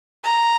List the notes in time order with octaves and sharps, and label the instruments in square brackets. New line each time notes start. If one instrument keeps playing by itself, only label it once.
[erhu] A#5